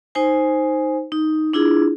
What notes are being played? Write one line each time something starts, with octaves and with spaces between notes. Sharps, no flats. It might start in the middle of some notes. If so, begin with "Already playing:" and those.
D#4 C5 G#5
D#4
D4 E4 F4 G#4